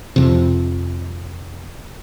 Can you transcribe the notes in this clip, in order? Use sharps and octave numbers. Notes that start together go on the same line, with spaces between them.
F2 C3